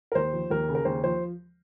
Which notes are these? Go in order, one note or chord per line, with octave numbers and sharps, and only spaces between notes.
A#4
D#2 C5
F3
D#2 A#4
C#3
A#4
D#2 C5
F3 C5